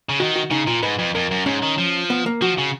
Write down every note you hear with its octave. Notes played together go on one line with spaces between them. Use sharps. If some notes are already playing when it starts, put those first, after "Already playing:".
C#3
D#3 F#4
F#4
C#3 D#4
A#2 F4
G#2 B4
F2
F2 A#4
F#2
G#2 C#4
D#3
F3
B3
A#3
F3 F#4
C#3